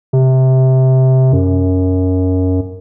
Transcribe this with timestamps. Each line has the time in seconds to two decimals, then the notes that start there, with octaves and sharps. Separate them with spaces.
0.13 C3
1.33 F#2